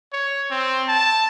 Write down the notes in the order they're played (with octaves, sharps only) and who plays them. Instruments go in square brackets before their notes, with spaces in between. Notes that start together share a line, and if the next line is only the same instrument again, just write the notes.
[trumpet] C#5
C4
A5